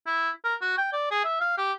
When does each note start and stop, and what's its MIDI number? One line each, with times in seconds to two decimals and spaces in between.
0.06 0.30 64
0.44 0.55 70
0.61 0.77 66
0.77 0.87 79
0.92 1.08 74
1.11 1.21 68
1.24 1.40 76
1.40 1.53 77
1.57 1.72 67